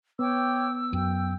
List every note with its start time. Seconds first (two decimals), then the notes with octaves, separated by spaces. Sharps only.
0.19 B3 C#5 G5 D6 E6
0.93 F#2 G5